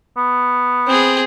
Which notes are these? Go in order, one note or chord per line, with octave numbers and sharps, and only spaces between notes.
B3
C4 G#4